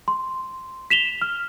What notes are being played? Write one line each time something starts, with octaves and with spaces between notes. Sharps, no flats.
C6
B6 E7 F7 G7
F6